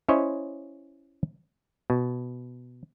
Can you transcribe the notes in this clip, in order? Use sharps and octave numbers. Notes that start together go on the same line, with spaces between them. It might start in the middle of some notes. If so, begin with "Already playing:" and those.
C#4 E4 C5 C#5 D#5
B2